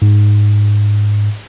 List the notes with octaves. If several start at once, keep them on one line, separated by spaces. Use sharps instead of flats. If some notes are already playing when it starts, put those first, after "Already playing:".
G#2